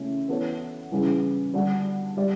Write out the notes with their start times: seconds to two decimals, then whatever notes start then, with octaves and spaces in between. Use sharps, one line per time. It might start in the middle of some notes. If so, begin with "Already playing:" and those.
Already playing: C#3 E3 A3 C#4 E4
0.28 E3 B3 F#4 A4 C#5
0.92 C#3 E3 G3
1.54 D3 G3 D4 F#4
2.17 G3 D4 G4 D5